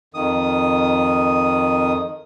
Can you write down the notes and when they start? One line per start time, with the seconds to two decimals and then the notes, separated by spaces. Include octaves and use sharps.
0.14 F2 D#3 D#6